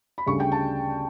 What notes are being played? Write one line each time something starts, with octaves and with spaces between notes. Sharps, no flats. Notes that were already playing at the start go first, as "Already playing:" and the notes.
B5
D2 C#3 G3 C#6
G5
A5